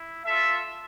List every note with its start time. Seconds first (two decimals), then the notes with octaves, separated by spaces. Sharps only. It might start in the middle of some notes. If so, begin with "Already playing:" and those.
Already playing: E4
0.24 F4 A4 E5